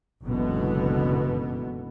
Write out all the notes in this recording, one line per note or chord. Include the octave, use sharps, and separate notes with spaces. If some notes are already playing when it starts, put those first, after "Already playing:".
F#1 C#2 B2 D3 E3 B3